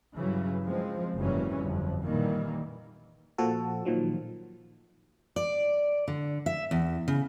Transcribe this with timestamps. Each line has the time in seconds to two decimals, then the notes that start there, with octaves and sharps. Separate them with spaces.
0.17 G2 C#3 E3 F#3
0.65 F3 G#3 C4
1.17 F#1 G#2 E3 F#3 G3 C#4
1.59 G1 F2
2.02 A#2 D#3 E3 G3 A#3
3.38 A#2 F3 F#4 A4
3.85 A#2 D#3 F3 F#3
5.36 D5
6.08 D3
6.46 E5
6.71 E2
7.08 C#3